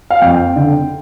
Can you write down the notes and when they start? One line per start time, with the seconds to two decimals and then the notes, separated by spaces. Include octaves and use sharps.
0.10 F5
0.21 F2 G5
0.56 D3